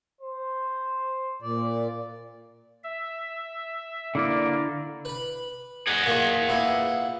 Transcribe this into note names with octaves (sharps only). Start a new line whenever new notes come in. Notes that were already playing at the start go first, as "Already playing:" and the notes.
C5
A#2 D5
E5
D3 A#3 E4 D5
B4 B5
G#4 F#5
E2 A#2
A#2 B3 E4